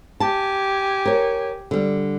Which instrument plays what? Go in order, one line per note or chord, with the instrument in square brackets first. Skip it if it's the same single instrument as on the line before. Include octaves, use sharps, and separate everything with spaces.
[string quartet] G4 G#5 [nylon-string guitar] A5
[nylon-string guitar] A#4 C#5
D3 G3